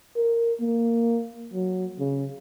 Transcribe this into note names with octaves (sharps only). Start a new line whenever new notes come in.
A#4
A#3
F#3
C#3